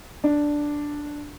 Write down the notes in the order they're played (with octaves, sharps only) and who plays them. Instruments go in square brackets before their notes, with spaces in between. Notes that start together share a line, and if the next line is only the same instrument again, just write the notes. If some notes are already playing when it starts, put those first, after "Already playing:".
[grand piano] D4